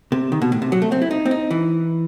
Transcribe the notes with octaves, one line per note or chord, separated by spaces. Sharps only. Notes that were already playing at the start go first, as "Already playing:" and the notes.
C3
D#3
B2
A2
C3
F#3
A3
C4
E4
D#4
C4
D#4
E3